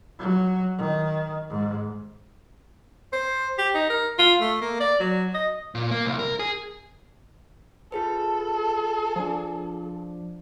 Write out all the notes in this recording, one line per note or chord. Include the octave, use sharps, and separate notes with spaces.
F#3
D#3
G#2
C5
G4
D#4
A#4
F4
A3
A#3
D5
F#3
D#5
A#2
A#3
C2
A#4
G#4
F4 G#4 A4 B4
F3 D4